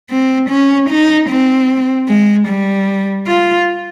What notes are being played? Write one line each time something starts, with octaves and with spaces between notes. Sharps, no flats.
C4
C#4
D#4
C4
G#3
G3
F4